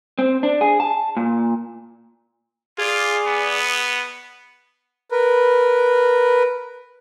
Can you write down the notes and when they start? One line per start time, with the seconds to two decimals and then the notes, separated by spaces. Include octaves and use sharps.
0.19 C4
0.43 D4
0.61 G#4
0.80 A5
1.17 A#2
2.78 F4 G#4 D5
3.26 B3
5.12 A#4 B4